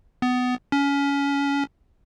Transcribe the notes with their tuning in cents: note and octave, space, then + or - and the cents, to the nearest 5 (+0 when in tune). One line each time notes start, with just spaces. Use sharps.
B3 +20
C#4 +25